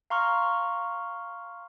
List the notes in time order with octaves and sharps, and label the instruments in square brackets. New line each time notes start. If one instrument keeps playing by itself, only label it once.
[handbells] F5 A#5 C6 C#6 F6